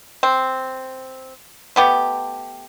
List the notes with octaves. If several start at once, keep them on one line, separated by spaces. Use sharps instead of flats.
C4
A3 B3 G4